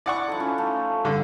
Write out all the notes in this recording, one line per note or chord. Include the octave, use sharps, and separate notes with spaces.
E4 D5 F#5 C#6
F3 D#4 A4
C#4 E4
F3 A3 D#4
G2 D3